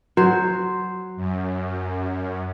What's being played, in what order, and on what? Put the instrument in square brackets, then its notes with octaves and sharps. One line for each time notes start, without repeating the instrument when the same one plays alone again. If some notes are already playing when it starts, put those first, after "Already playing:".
[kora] F#3 C5
[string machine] F#2